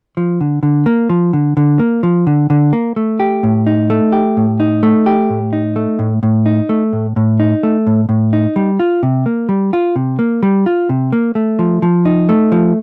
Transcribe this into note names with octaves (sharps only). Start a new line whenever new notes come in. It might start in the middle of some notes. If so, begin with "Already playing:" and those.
F3
D3
D3
A#3
F3
D3
D3
A#3
F3
D3
D3
A#3
A3
G4
A2
D#4
A3
G4
A2
D#4
A3
G4
A2
D#4
A3
A2
A2
D#4
A3
A2
A2
D#4
A3
A2
A2
D#4
G3
F4
C3
A#3
G3
F4
C3
A#3
G3
F4
C3
A#3
A3
F3
F3
D#4
A3
F3